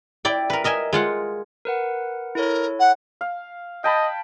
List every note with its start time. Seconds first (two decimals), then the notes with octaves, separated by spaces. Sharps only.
0.25 E4 D5 G5
0.50 A#4 B4
0.64 A#4 D#5 E5 G#5
0.93 G#3 F4 F#5
1.65 A#4 B4 F#5
2.35 E4 A4 A#4 C#5
2.79 F#5
3.21 F5
3.84 D#5 G5 A5 B5